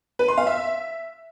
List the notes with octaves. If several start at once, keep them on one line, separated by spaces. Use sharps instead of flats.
B4
C6
F5
E5